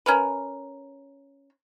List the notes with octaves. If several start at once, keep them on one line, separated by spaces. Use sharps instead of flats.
C#4 A#4 B4